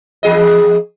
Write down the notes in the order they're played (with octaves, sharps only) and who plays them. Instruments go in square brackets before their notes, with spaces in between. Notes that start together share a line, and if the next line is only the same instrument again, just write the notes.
[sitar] E2 G#4 D#5